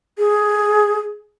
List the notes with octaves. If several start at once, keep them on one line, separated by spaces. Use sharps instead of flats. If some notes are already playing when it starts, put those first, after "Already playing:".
G#4